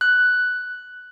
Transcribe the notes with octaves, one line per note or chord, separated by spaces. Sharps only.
F#6